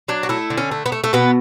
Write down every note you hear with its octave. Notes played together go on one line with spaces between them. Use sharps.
F#3 D4
F#4
A3 E4
D3
C#4
A3
B3
A3
A3
B2 B3